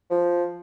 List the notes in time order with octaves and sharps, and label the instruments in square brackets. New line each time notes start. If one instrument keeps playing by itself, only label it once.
[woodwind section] F3